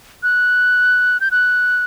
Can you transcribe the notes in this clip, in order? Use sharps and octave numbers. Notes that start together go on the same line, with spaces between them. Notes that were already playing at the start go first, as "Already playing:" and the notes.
F#6
G6
F#6